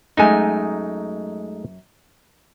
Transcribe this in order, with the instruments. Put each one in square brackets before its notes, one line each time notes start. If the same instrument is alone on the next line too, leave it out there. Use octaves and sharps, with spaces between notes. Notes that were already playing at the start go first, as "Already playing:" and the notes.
[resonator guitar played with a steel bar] F#2 G#5 [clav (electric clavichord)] G#3 A3 D#4